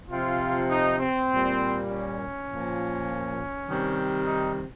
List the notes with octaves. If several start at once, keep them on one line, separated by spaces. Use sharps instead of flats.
C3 F3 F4
D#4
C4
A#2 G3
C#4
A#2 F3
C3 D#3 G3
D#4